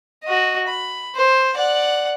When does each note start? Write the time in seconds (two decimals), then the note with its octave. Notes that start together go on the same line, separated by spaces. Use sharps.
0.24 F#4 D#5
0.68 B5
1.16 C5
1.56 D5 F#5